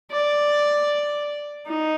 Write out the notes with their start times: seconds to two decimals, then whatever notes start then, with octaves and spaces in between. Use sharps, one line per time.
0.11 D5
1.67 D#4